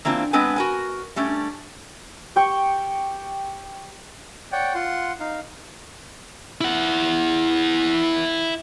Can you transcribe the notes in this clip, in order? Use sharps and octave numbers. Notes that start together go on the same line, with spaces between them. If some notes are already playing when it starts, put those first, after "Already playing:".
E3 A#3 C4 D4 F4
G#3 B3 C4 D4 B4 G#5
F#4 A#4 G#5
G3 A3 C#4 D4
G4 G5 C#6
C#5 D5 F#5 G5
F4 F#5 C6
D#4 F5
E4 F#5